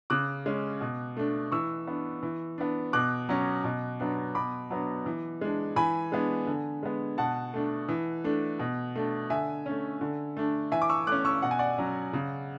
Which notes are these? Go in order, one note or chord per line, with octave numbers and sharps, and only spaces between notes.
C#3 D6 F#6
G#3 C#4
B2
A3 D4
E3 C#6 E6
B3 D4
E3
B3 D4
B2 D6 F#6
F#3 C#4
B2
F#3 B3 D4
B2 B5 D6
F#3 B3 D4
E3
G#3 D4
E3 G#5 B5
G#3 B3 D4
D3
G#3 B3
B2 F#5 A5
A3 D4
E3
A3 D4
B2
A3 D4
D3 E5 G#5
A3 C#4
D3
A3 D4
E3 E5 G#5
D6
C#6 E6
A3 C#4 D6 F#6
C#6 E6
B2 F#5
G#5
D5 F#5
F#3 C#4
C#3